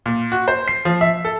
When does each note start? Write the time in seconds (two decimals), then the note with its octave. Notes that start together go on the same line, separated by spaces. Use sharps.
0.06 A#2
0.32 F#4
0.48 C5
0.68 C7
0.85 F3
1.01 E5
1.25 A4